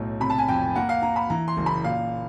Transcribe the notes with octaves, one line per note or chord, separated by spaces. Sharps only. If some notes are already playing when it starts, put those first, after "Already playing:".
Already playing: B1 A2
C3 B5
A5
G#5
F2 G5
A#3 F#5
F5
A#3 A#5
B5
E3 A#5
C6
F#1
B5
A#2 F5